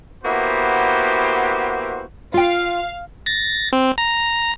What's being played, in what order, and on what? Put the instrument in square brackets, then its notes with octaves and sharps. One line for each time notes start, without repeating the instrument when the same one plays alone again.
[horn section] A#3 B3 E4 F#4 G4 C5
[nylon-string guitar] F4 G5 [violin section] F5
[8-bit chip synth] A6 A#6
C4
A#5